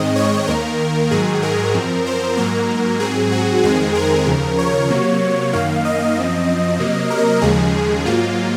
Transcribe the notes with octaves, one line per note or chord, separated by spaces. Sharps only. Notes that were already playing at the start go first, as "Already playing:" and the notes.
Already playing: G#2 D#3 G#3 C4 D#5
C#5
D#2 D#3 A#3 A#4
G#2 D#3 F#3 G#4
A#4
F#2 F3 C4
C5
G#2 F#3 A#3 A#4
G#2 F#3 C4 G#4
F#4
F2 D#3 G#3 C4 G#4
A#4
D#2 C#3 F3
C#5
C3 F#3 A#3
F#2 D#3 A#3 F5
D#5
F#2 F3 C4
C3 F#3 A#3
A#4
D#2 C#3 F3 G#3 G#4
G#2 F#3 A#3 F4